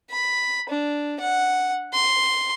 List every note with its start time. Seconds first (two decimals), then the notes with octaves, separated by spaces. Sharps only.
0.10 B5
0.70 D4
1.20 F#5
1.94 C6